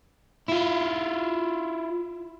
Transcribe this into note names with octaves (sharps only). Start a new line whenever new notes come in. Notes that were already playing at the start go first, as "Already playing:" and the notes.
E4 F4